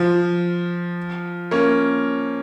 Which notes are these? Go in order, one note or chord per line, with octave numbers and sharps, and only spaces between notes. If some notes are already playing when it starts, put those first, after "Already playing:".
Already playing: F3
A#3 C#4